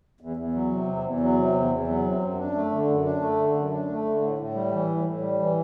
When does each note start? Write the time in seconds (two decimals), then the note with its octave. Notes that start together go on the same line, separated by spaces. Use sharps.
0.21 E2
0.37 E2
0.54 F#3
0.71 C3
0.88 E2
1.04 E2
1.20 F#3
1.37 C3
1.54 E2
1.70 E2
1.88 F#3
2.05 C3
2.22 F#2
2.38 D4
2.54 A3
2.72 D3
2.88 F#2
3.04 D4
3.21 A3
3.38 D3
3.55 F#2
3.71 D4
3.88 A3
4.05 D3
4.21 A2
4.38 A2
4.54 G3
4.72 E3
4.89 A2
5.05 A2
5.21 G3
5.39 E3